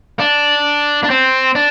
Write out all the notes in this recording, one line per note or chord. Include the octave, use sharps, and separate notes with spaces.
D4
D4
C4
D4